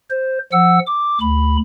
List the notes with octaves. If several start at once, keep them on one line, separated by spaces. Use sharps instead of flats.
C5
F3 F#5 E6
D6
D2 B5